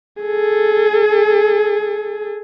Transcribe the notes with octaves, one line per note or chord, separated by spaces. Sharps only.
G#4 A4